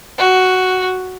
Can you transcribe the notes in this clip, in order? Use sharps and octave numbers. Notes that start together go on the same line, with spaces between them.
F#4